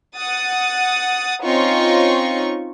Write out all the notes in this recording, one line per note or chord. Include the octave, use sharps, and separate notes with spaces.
F#5 D#6 A6
C4 C#4 D#4 F4 C#6